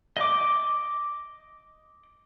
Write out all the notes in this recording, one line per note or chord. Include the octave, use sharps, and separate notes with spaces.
D#5 D6